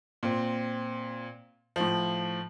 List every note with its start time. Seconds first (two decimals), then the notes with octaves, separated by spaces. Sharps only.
0.23 A#2 C4
1.76 A2 F3